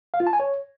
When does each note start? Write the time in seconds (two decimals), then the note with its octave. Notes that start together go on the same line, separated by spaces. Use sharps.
0.14 F5
0.20 F4
0.27 A5
0.33 G#5
0.40 C#5